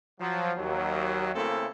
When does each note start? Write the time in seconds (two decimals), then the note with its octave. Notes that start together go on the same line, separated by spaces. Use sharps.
0.20 F3 F#3
0.57 D#2 F#3
1.35 C#3 A3 A#3 C4 E4 A4